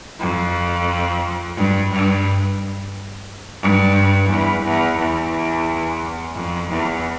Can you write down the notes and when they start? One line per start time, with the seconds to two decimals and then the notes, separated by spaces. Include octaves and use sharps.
0.20 F2
1.57 G2
1.91 G2
3.62 G2
4.29 E2
4.65 E2
4.99 E2
6.35 F2
6.70 E2